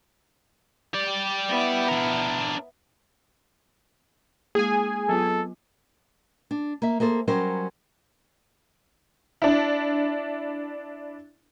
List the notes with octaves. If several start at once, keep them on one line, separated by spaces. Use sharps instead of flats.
G4 D5
B3 E4
D4 A#4
G#3 A#3 G#4 G#5
F#3 B3 F4 A4
D4
A#3 E5
A#3 G#4 A4 C5
F#3 G3 C#4 G4 A#4 C5
D4 E4